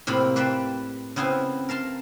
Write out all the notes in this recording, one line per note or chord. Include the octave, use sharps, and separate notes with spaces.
A2 C3 A#3 F4 B5
G4 B4 C5 D5 E5 G5
C#3 B3 C4 E4 F5 G#5
A#4 F5 A5 C6